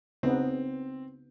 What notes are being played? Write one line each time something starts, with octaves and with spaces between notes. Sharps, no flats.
C#3 B3 C4 D#4